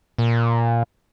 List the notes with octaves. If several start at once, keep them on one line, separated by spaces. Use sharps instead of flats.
A#2